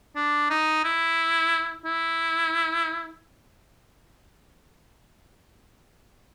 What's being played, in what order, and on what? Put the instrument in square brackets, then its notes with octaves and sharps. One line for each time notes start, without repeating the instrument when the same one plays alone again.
[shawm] D4
D#4
E4
E4